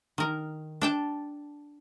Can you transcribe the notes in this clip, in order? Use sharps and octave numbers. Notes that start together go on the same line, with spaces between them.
D#3 A#4
D4 G5 A5